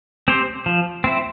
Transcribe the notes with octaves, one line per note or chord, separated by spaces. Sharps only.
C4 G4 C5
F3
C4 E4